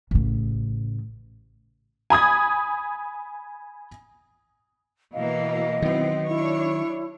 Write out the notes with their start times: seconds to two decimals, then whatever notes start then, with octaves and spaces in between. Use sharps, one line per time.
0.11 A1 C#3
2.10 G#5 B5 D#6 G#6
5.14 B2 E3 A#3 D#5 F5
5.82 D#3 F#3 B3 C4 E4
6.28 D4 E4 C#5